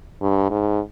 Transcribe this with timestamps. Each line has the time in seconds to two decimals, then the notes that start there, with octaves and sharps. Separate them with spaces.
0.22 G2
0.50 G#2